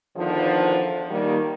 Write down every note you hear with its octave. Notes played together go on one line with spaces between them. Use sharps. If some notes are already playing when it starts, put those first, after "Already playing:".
E2 D3 D#3 F3
D#3 G3 A#3